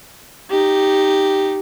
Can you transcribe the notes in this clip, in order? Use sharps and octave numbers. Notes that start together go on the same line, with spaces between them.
D#4 G4